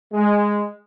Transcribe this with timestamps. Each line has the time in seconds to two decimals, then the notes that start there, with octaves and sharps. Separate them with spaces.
0.12 G#3